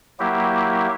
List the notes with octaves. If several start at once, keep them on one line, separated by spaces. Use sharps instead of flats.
F#3 A#3 E4 G4